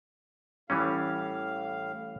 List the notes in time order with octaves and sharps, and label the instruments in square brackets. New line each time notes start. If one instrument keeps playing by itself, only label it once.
[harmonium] A2 F5 [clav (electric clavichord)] E3 G3 C#4